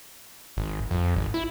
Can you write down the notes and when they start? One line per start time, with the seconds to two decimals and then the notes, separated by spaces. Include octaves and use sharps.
0.57 G#1
0.91 F2
1.16 G#1
1.34 E4